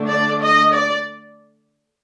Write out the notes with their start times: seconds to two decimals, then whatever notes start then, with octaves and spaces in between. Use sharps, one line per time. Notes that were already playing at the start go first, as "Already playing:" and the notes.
Already playing: D3 A3 D4
0.09 D5
0.41 D#5
0.72 D5